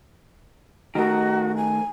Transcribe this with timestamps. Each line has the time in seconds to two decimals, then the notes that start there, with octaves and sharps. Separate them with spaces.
0.95 D#3 A3 F#4 A#4
1.57 G#5